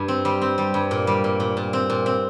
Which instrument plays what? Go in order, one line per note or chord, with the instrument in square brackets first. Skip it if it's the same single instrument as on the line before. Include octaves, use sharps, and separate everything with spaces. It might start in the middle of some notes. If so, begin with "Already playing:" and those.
Already playing: [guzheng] G2
C4
G3
C4
G3
G2
A#2
G3
A#2
A#2
A#2
C4
A#2
C4